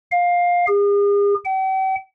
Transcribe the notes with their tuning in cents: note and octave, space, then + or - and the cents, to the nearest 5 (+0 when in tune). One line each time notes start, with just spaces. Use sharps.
F5 +15
G#4 -45
G5 -45